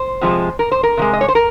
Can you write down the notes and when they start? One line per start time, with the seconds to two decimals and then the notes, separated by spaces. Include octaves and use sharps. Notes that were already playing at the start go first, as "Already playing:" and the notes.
Already playing: C5
0.21 C3 F3 G#3
0.59 A#4
0.72 C5
0.83 A#4
0.97 C3 F3
1.02 G#3
1.13 D#5
1.21 C#5
1.28 C5
1.35 A#4